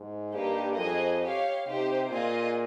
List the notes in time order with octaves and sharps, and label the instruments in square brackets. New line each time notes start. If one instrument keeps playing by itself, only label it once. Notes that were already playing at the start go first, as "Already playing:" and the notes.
Already playing: [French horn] G#2
[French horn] G2 [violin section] A#3 D#4 G4
[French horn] F2 [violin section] G#4 C5 D#5
[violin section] G4 C#5 F5
[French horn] C3 [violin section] D#4 G4 C5
[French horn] A#2 [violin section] F4 G#4 D#5